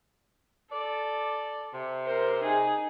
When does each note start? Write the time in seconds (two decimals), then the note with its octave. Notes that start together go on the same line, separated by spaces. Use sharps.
0.72 A4 D5
1.74 C3
2.05 A#4 C5
2.43 D#4 G#4